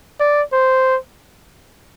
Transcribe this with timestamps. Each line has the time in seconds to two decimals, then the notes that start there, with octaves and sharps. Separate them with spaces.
0.20 D5
0.53 C5